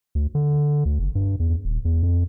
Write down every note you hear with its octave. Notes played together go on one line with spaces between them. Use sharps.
D2
D3
D2
F#1
G2
E2
D#1
E2
F2